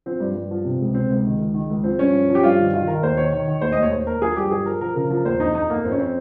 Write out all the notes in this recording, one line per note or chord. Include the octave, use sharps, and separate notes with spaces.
F3 C4
G2
G2
F3
C3
C#2
C3 C4
C#2
D#3
C#2
D#3
C#2
F3 C4
G2 C#4
F3
F3
G4
G2 F4
D#3
D#3 F4
D#3 A#4
D#2 C5
D#3 C#5
D#3
D#3
D#2 C5
D#5
D#2 C#5
D#2 C5
D#2 A#4
F3 G#4
G2 G4
F3 G#4
F3 A#4
F3 A#4
C#3 A#4
F3 A#4
D#2 C5
F2 D#4
F2 D#4
F2 A#3
F2 C4
C#4
C4